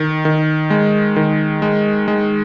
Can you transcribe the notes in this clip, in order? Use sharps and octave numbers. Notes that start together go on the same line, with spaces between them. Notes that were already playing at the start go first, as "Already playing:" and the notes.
Already playing: D#3
D#3
G#3
D#3
G#3
G#3